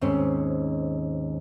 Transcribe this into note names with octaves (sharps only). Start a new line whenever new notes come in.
D#2 G#2 C4 C#4